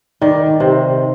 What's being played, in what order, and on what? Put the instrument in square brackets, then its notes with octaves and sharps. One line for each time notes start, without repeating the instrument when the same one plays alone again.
[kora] D#3 [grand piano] D5
[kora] C3 [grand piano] C5